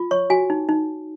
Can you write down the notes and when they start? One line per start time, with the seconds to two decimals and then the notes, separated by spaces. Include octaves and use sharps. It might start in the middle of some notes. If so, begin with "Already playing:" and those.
Already playing: F4
0.11 C#5 C#6
0.30 F#4 G#5
0.50 D#4
0.69 D#4